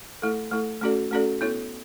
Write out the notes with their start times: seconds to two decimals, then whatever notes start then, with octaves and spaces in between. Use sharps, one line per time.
0.22 A3 E4 A4
0.52 A3 E4 A4
0.81 A3 C#4 F#4 A4 D5
1.11 A3 C#4 F#4 A4 D5
1.41 B3 E4 A4 C#5